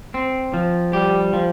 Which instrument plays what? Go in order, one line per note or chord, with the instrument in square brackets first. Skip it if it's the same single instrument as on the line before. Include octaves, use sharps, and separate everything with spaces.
[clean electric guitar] C4
F3
[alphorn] G3 [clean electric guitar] G4
[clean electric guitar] F3